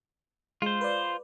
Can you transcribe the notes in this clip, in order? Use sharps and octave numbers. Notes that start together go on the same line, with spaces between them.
G#3 F4 C5
B4 D5